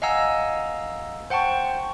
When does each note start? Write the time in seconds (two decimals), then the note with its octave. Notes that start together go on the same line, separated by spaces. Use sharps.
0.02 D#5 F5 F#5 G#5 A#5 E6
1.30 C5 F#5 G5 A5 C#6